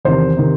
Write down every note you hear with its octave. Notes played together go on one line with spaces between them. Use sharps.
E2 C3 D#3 C5
C3 D#3